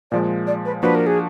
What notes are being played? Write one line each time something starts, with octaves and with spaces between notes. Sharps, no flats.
A#2 F3 G#3 D5
D5
B4
F3 A#3 D4 F#4 B4
A#4
G#4